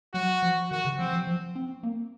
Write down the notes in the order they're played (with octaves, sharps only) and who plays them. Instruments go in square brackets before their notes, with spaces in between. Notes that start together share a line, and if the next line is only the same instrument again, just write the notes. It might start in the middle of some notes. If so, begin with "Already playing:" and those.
[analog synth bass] F#3 [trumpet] F#4
[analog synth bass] F3
[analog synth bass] D#3 [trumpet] F#4
[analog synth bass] C#3
[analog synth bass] F3 [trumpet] C4
[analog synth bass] F3
F3
C4
A#3